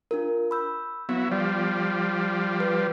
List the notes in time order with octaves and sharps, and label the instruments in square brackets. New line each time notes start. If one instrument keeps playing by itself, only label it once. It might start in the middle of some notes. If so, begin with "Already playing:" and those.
[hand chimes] D4 F4 A#4
B5 E6 G6
[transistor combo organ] F#3 E4 [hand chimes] B3
[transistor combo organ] F3 G3 [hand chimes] D5
[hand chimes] B4